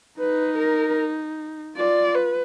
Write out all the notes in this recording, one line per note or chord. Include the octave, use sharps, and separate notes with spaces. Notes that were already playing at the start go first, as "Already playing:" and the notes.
D#4 B4
A#4
F4 D5
B4